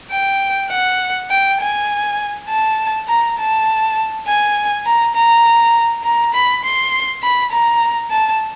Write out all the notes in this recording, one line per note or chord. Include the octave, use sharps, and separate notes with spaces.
G5
F#5
G5
G#5
A5
A#5
A5
G#5
A#5
A#5
A#5
B5
C6
B5
A#5
A5